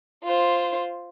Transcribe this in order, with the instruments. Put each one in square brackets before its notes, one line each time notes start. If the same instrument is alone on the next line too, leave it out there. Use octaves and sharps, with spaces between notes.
[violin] F4 C5